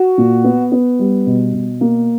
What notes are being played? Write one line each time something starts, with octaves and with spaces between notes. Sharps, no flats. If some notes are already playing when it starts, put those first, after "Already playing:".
Already playing: F#4
A#2
B3
B3
G3
B2
B2
A#3